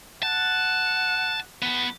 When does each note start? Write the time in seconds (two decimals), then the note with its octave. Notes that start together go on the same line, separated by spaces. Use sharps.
0.23 F#5 A5
1.62 E2 B3